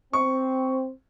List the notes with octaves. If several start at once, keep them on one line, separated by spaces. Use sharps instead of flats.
C4 C#6